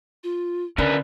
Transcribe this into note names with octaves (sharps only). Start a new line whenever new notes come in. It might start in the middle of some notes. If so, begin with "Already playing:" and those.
F4
D3 C#4 A#4 B4 D5